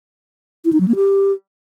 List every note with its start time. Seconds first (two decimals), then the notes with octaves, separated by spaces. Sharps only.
0.65 E4
0.73 D#4
0.80 F#3
0.88 A#3
0.96 G4